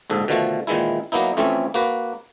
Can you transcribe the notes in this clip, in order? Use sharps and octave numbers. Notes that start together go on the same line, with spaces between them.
A#1 G#2 D3 A4
B2 D3 D#3 F3 A3
A#2 D#3 E3 G#3 E4
F#3 A#3 B3 D#4 E4
F2 E3 A3 C4 C#4
A#3 F#4 B4